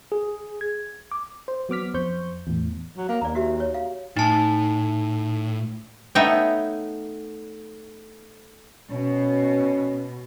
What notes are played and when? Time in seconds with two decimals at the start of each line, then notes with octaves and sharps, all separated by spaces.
0.12 G#4
0.61 G#6
1.12 D6
1.48 C5
1.69 F#3 B3 D6 F6 B6
1.94 F2 C5 C#6 G6
2.47 E2 A2
2.97 F#3
3.09 A#3 F5
3.21 D#2 D5 A#5
3.35 F#4 G4 E5
3.60 C#5
3.74 F5
4.16 A2 D#4 A5
6.15 A3 B3 D#4 C#5 E5 G5
8.92 B2 C#4